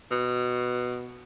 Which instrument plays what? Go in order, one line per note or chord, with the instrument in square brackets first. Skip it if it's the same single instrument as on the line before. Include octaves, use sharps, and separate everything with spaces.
[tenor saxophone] B2